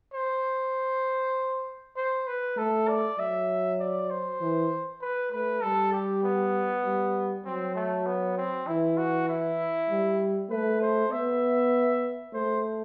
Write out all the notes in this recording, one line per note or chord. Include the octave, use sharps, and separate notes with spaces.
C5
C5
B4
A3 A4
D5
F#3 E5
D5
C5
E3
B4
A3 B4
G3 A4
G4
B3
G3
F#3 C4
A3
B3
C4
E3 E4
F#4
E4
G3
A3 B4
C5
B3 E5
A3 C5